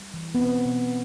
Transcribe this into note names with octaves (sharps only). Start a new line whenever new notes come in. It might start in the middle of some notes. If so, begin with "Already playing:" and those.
Already playing: G3
E3
B3
B2 C4
B2